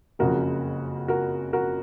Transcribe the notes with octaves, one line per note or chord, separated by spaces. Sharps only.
F#1 F2 C#3 F#4 A#4
F#4 A#4
F#4 A#4